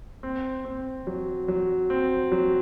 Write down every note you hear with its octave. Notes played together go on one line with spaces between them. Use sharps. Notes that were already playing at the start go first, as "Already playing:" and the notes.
C4
C4
F#3
F#3
C4
F#3